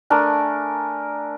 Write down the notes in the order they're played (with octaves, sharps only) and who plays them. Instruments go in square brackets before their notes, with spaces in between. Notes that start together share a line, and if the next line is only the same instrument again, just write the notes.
[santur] A3 D4 A#4 G#5